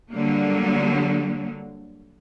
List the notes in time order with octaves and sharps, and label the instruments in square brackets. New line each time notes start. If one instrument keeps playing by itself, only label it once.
[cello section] D3 F#3 G3 A#3